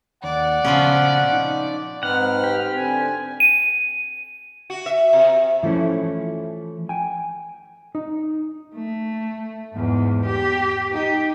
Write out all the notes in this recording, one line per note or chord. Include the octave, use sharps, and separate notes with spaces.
D#2 D5 F#5
A#2 C#3 F3 B3 C#4
D#4
G#2 C4 D#4 B4 F#5 F6
G4
D3 C4 G#5
D#7
F#4
E5
C3
E3 F3 A3 C#4 E4
G5 G#5
D#4
A3
E2 G#2
G4
D#4 G4